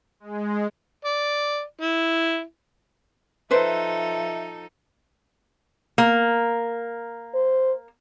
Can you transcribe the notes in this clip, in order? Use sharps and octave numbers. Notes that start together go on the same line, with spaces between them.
G#3
D5
E4
F3 D#4 A4 B4 C5 E5
A#3
C5